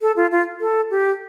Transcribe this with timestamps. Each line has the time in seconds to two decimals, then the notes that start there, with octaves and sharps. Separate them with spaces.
0.02 A4
0.16 F4
0.31 F4
0.61 A4
0.90 G4